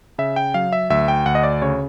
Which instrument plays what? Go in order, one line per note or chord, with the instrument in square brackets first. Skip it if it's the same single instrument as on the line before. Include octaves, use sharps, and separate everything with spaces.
[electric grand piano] C#3 E5
G5
F#3 F5
E5
D2 E5
G5
D2 F#5
D#5
D5
C#3 C#5